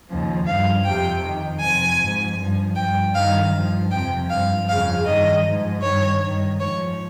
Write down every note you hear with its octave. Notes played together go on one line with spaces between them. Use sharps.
D#2 C#3 F3
G2 F3 F5
F2 C3 F3 G5
F2 D#3
F2 C3 F3 G#5
G#2 F3
G2 F3
G2 F3 G5
G2 D#3 F5
G2 F3
F2 C3 F3 G5
G2 F5
F3
F2 C#3 F3 F5
G2 D#3 D#5
G#2 F3
G2 D#3 C#5
G2 D#3
G#2 F3 C#5